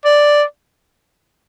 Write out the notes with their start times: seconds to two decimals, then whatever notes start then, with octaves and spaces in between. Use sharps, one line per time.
0.05 D5